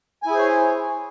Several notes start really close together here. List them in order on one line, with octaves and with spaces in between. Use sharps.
G#5 E4 G#4 C5 C#5